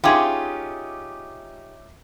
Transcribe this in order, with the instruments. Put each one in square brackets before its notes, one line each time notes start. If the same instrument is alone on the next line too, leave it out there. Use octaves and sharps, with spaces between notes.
[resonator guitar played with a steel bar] C#4 D#4 F4 [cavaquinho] G4 G#4 [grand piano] E5 D6